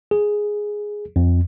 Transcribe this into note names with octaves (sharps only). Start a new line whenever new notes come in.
G#4
F2